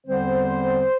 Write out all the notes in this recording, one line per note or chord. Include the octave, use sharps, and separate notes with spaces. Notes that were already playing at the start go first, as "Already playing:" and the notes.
E2 D3 G3 C4 C5